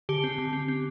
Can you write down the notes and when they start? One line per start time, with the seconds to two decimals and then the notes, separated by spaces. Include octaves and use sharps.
0.09 D3 G4
0.24 C4
0.38 D3
0.53 C4
0.68 C4